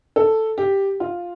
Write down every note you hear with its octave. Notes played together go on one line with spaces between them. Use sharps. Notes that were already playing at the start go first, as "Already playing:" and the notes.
A4
G4
F4